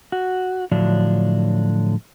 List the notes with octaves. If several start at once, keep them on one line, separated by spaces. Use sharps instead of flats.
F#4
A2 D3 F3 F#3 D4